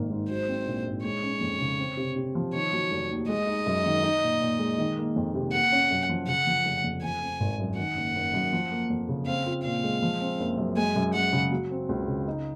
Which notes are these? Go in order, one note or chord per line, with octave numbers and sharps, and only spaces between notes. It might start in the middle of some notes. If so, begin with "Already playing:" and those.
Already playing: G#1 D#3 A#3
G#2
F#3 C5
C4
A#1
G#2
G#3 C#5
C#4
F2
C#3
C4
C3
C3
F3
D#3 C#5
F#3
F1
D#2
G#3 D#5
D#4
F#2
D#3
D#4
A#2
A#2
G#3
D#3
A#3
F2
C3
A#3 F#5
C#4
F#2
F3
C#3 F#5
F3
F1
F2
F3 G#5
C4
G#1
F#2
D#3 F#5
F#1
F#1
F#2
F3
A#3
F2
C#3
C4 F5
F4
A#2 F5
G#3
F3
C4
F#1
F#2
G#3 G#5
F#2
F#2 F#5
C#3
F#3
C4
C#2
C#3
D#4